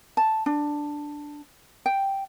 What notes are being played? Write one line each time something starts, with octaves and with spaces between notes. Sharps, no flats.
A5
D4
G5